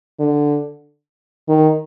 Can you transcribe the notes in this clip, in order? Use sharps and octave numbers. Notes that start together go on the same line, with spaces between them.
D3
D#3